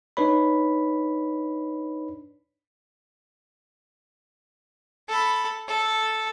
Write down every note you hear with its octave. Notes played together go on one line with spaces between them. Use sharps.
D4 D#4 B4 C#5 B5
A4 B5
A4